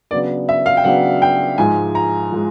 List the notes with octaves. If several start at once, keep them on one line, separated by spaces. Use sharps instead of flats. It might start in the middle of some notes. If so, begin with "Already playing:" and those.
C#3 F#3 B3 D4 D5
E5
F5
G5
C#3 F#3 B3 D4 F#5
G5
G#2 F3 G#3 G#5
A#5
F3 G#3